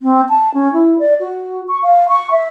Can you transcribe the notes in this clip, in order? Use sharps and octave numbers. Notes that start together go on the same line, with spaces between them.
C4
A5
C#4
E4
D5
F#4
C#6
F5
C#6
E5